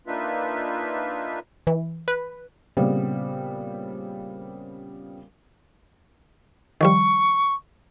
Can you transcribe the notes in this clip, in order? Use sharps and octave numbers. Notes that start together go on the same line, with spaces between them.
A#3 D4 D#4 F4 B4 E5
E3
B4
A#2 C#3 G3 B3 C4
D#3 F3 G3 C#6